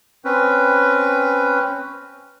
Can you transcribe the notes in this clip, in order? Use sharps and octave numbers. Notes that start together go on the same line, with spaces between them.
C4 C#4 B4